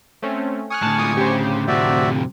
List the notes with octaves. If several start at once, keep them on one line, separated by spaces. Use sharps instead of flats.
A3 C4 C#4
G#5 C#6 D#6 F6 F#6
A2 D3 A5
G#3 F4 D6 D#6
C#3 G4 C5
F2 C3 F#4 D5 E5